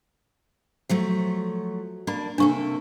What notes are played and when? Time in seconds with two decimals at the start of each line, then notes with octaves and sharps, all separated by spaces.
0.89 F3 F#3 A3
2.07 A#3 D4 D5 B5
2.38 C3 A#3 D4 A4 C#6